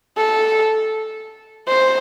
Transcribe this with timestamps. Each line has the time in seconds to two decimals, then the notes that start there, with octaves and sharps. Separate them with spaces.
0.18 A4
1.68 C5